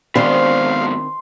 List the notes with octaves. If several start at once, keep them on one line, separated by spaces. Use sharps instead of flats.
G#2 B2 D#3 C4 D4 F5 C6